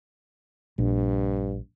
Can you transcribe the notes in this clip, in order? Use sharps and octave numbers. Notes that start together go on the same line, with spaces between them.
A#1 G2